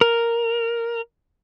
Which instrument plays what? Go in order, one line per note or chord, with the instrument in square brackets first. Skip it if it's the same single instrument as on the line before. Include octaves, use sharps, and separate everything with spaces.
[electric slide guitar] A#4